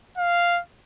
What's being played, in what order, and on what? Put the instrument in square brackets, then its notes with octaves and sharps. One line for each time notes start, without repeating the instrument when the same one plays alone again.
[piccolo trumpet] F5